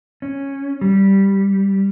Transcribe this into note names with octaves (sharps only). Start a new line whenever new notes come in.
C#4
G3